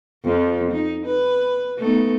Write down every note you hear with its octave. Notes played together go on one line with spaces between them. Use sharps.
F2 F3
D#4
B4
A3 B3 D#4